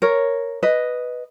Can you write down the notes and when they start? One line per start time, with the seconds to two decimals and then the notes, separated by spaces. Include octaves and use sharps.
0.02 A#4 C#5
0.63 B4 D#5